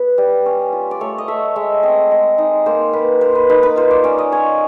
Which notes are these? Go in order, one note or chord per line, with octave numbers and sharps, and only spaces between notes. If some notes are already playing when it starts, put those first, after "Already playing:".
Already playing: B3 B4
G3
C#4
F4
D5
A3 C#5
D#5
A3 E5
G#3 E5
C4 D#5
G#3
D#4
A#3 C5
A#3 B4
A#3 C5
B4
D#4 B4
B4
F4 C5
D5
C#4 D5
D#5
C#4 C#5